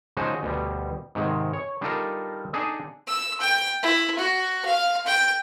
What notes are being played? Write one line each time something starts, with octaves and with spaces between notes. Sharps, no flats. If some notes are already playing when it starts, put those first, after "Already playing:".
C#3 F3 G#3 D#4 F#4 C5
D2 B2 G3
G#2 C3 D#3 G#3
C#5
G3 D4 D#4 F4 A4 A#4
D4 D#4 G#4 A4 D#5
E6
G5
E4
F#4
F5
G5